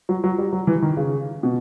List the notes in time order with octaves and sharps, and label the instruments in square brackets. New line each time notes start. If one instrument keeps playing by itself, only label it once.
[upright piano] F#3
F#3
G3
F#3
E3
D#3
C#3
B2